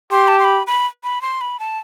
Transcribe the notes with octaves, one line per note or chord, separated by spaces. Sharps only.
G4 C6
A5
C6
B5
B5
B5
C6
B5
A5